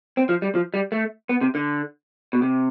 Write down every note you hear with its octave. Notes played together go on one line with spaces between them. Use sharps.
C4
F3
G3
F3
G3
A3
B3
C3
D3
B2
C3